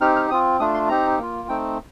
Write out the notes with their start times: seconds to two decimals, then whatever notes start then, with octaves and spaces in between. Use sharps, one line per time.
0.01 C4 D#4 G4 F6
0.16 F6
0.30 C4 F4 D#6
0.60 A3 D4 F4 D#6
0.74 C6
0.89 C4 D#4 G4 A#5
1.18 A#3 F4
1.49 A3 C4 D#4 G5